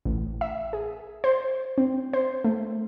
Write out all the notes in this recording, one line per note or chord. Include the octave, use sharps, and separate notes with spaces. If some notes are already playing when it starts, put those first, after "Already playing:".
A1
E5
G#4
C5
C4
C5
A3